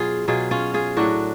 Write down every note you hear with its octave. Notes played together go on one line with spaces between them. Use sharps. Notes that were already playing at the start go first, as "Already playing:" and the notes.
Already playing: B2 F#3 F4 G#4
B2 F#3 F4 G#4
C#4 F4
F4 G#4
A2 F#3 D4 F#4